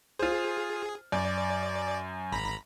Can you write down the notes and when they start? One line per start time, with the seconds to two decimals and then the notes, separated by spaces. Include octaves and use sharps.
0.19 F4 G#4 C5
1.12 F#2 D5
2.32 G#1 A#5 B5